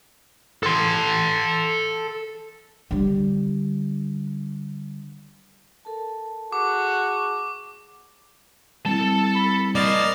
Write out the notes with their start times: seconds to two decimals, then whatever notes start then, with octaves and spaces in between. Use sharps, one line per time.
0.63 A4 C6
2.91 D3 G3
5.85 A4 A#4 A5
6.52 F#4 G#4 F#5 A5 D6
8.86 G3 C4 E4 A4 A5
9.35 B5
9.75 A#3 C5 D5 D#5 F6 A6